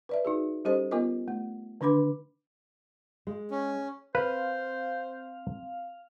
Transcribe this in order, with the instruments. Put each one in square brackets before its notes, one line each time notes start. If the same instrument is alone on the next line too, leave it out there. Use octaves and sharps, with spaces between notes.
[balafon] B4 D5 E5
D#4 F#4 G#4
G3 C#4 G4 A4 C5 D#5
B3 F4 A#4 D#5
A3
D3 D#3 D4 B4 B5 D6
[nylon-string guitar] G#3
[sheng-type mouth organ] C#4
[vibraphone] C4 [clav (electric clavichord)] B4 [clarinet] C5 [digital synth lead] F5